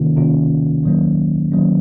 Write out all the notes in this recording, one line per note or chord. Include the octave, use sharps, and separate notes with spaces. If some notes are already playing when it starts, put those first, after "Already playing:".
Already playing: C3 D#3 A#3 C#4 F4
C3 D#3 A#3 C#4 F4
D#3 F#3 A#3 C#4
D#3 F#3 A#3 C#4